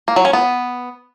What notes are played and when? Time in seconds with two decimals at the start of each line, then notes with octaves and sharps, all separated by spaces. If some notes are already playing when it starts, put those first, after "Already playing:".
0.08 A#3
0.16 F#3
0.25 C#4
0.33 B3